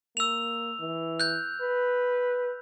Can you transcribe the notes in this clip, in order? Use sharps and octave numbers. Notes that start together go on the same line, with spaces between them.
A#3 E6 F7
E3
F#6 G6
B4